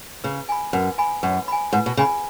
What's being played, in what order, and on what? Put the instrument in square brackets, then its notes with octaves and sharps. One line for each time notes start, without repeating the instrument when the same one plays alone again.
[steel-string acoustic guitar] C#3 [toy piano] B4
[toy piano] G#5 B5
[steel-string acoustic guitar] F#2 [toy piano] B4
[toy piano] G#5 B5
[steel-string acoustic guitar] F#2 [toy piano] B4
[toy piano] G#5 B5
[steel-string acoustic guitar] G#2 [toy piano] B4
[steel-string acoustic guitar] B2
[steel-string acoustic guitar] C#3 [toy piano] G#5 B5